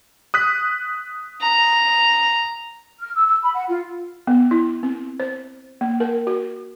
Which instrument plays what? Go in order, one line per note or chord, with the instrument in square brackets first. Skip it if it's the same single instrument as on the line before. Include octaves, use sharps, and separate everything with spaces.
[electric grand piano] D#6 F#6 B6
[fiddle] A#5
[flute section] F6
E6
E6
B5
F#5
F4
[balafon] B3
E4
C4
C5
A#3
A#4
F#4